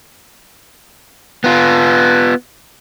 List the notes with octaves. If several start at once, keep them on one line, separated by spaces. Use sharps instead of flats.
B3 F4